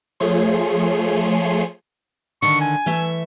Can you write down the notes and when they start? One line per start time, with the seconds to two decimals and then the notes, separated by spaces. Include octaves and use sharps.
0.20 F3 A3 G#4 C#5 C6
2.42 D3 D#3 C#6
2.61 G#5
2.86 E3 A3 E5